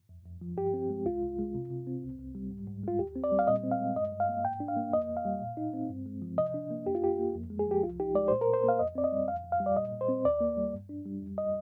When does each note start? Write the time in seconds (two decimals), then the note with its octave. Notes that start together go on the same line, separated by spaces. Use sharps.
0.09 F2
0.25 F2
0.41 F3
0.57 G2 G4
0.74 C4
0.89 G#3
1.06 C2 F4
1.22 C2
1.39 G#3
1.54 C3
1.70 C3
1.87 C4
2.03 C2
2.19 C2
2.35 G3
2.51 G#2
2.67 G#2
2.83 G#3 F4
2.99 D#2 G4
3.15 C4
3.24 D5
3.32 G3
3.39 F5
3.48 A#2 D#5
3.63 C4
3.71 F5
3.80 G#3
3.96 G2 D#5
4.12 G2
4.20 F5
4.29 A#3
4.44 G#2 G5
4.60 D4
4.68 F5
4.77 A#3
4.93 F2 D#5
5.09 F2
5.17 F5
5.25 G3
5.41 A#2
5.57 D#4
5.74 C4
5.90 G2
6.06 G#3
6.22 F3
6.38 C3 D#5
6.54 D4
6.70 A#3
6.86 F2 G4
6.95 F4
7.02 F2 G4
7.19 A#3
7.35 F2
7.50 G#3
7.59 G#4
7.67 F3 G4
7.83 C2 F4
8.00 D#4 G4
8.15 G#3 D5
8.28 A#2 C5
8.41 A#4
8.48 A#2
8.54 C5
8.63 A#3
8.69 F5
8.79 F2 D#5
8.95 C4 D5
9.04 D#5
9.12 G3
9.28 F2 F5
9.44 F2
9.52 F5
9.60 G3
9.66 D5
9.76 A#2 D#5
9.92 A#2
10.01 C5
10.09 C4
10.25 D#2 D5
10.41 A#3
10.57 G3
10.73 G2
10.89 D4
11.06 G3
11.22 F2
11.38 D#5